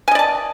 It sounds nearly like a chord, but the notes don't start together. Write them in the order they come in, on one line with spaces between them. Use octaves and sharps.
G#5 D#5 D5 A5